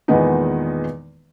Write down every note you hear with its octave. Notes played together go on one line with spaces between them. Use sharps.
E2 A#2 D#3 G#3 B3 D#4